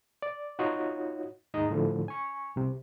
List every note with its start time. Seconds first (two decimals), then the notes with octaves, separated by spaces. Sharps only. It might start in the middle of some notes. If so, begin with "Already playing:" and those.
0.22 D5
0.59 D#4 F4 F#4 C#5 D#5
1.54 D#2 G#2 D#4 G#4 D#5 A#5
1.70 A2 D3 F3
2.08 G#5 C#6
2.56 C2 C3